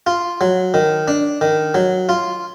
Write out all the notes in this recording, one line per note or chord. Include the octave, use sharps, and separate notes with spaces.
F4
F#3
D#3
D4
D#3
F#3
F4